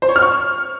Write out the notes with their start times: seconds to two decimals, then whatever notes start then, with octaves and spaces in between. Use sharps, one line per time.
0.02 C5
0.09 C#5
0.16 F6
0.23 C#6